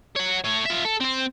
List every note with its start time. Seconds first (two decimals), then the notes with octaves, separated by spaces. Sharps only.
0.16 C#5 F#5
0.44 A3 C#5
0.66 F4 E5
0.85 A4
1.01 C4 C5